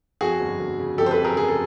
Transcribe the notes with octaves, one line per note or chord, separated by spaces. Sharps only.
F2 F#4 G#4
G1
G1
C#3
F2 G4 A4
C5
A4 B4
F2
G#4 A#4
C#3 G#4
A4